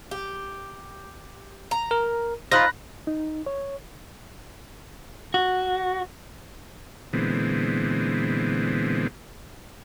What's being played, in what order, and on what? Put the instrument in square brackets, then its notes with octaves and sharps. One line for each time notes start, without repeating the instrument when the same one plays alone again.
[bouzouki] G4
A#5
[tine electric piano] A#4
[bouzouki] D#4 F4 C5 [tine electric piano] B5 F#6 A#6
[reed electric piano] D#4
C#5
[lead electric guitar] F#4
[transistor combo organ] A#2 D3 E3 G#3 B3 C4